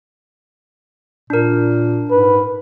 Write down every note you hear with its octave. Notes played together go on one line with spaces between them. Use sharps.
A#2 D4 A#4
G#2 B4